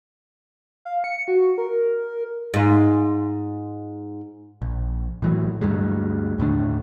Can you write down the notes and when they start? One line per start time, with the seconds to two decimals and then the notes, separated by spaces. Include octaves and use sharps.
0.85 F5
1.04 C#7
1.28 F#4
1.58 A#4
2.54 G#2 F4
4.62 A#1
5.22 A2 E3 F#3
5.61 D2 G2 G3 G#3
6.38 D#2 A2 D3 D4